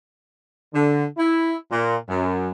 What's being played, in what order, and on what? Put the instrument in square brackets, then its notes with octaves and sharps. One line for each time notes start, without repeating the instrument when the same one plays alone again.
[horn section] D3
E4
A#2
F#2